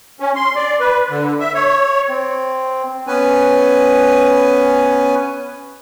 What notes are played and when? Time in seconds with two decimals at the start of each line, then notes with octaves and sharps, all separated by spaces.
0.20 C#4
0.36 C6
0.56 D5
0.80 B4
1.10 D3
1.40 E5
1.54 C#5
2.09 C4
3.07 B3 C#4 B4 G#5